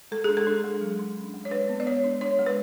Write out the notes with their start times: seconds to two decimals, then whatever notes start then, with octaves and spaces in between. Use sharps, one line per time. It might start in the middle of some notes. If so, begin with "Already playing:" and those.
0.12 G#3 A4
0.24 D4 G#4
0.37 A4
0.47 D4
0.64 G#3
0.81 F#3
0.99 D4
1.17 C#4
1.34 G#3
1.45 C#5
1.51 D4 B4
1.69 B3
1.80 D5
1.87 G#3 C#5
2.04 D4
2.21 D4 C#5
2.39 G#3
2.46 B4